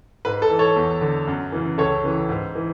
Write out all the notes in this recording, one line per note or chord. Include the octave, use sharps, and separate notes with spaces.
G#2 B4
A4
E3
A4 C#5
E2
D3
F#2
C#3 E3
C#2 A4 C#5
C#3 E3
G#2
E3